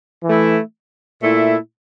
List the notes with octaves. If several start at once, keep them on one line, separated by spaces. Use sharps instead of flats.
E3 A3 E4
A#2 A3 E4